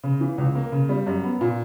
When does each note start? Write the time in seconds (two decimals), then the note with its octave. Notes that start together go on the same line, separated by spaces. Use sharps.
0.03 C#3
0.21 E3
0.38 C#2
0.55 A#3
0.72 C#3
0.89 G3
1.07 F#2
1.24 B3
1.41 A#2